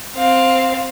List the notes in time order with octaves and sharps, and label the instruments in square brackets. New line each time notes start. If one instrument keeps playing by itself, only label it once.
[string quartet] C4 F5